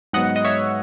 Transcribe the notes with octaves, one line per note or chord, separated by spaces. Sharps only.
G#2 F#3 B3 D#5 F#5
D#5
C#5 E5